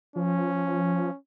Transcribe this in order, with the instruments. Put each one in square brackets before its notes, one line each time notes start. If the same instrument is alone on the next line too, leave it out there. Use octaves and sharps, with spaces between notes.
[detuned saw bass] F3 [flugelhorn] C#4